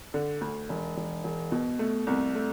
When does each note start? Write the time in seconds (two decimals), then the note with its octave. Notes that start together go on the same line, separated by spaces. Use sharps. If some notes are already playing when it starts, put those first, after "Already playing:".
0.14 D3
0.41 D2
0.69 E1
0.97 E1
1.24 E1
1.52 B2
1.79 A3
2.07 C2
2.35 A3